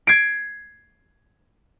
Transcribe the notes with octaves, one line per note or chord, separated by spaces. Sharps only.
G#6 C7 D7